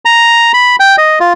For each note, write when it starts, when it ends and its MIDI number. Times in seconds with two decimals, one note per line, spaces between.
0.05 0.52 82
0.54 0.76 83
0.80 0.96 79
0.98 1.19 75
1.20 1.33 65